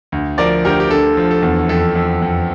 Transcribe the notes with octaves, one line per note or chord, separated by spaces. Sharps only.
D2
F3 A#4 D5
D2 G4 A#4
G4
D3 A4
F3
A4
E2
F2 A4
F2
F2